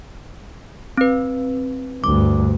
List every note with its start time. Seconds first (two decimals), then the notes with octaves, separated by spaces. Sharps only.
0.97 C4 B4
2.04 D2 G2 D6